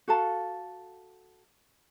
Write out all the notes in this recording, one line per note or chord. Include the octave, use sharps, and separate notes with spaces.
F#4 A4 F5 A5